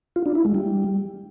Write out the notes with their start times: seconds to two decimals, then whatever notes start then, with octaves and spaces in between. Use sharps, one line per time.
0.16 F4
0.26 D4
0.35 E4
0.45 G#3
0.54 G3